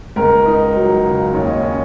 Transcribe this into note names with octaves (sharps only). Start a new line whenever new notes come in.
C#2 A#4
D#4
F#3
C#3
D#2 C#5
D#5
C#5
C#4